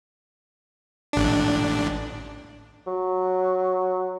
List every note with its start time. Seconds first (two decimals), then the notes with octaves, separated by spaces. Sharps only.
1.13 A1 D4
2.87 F#3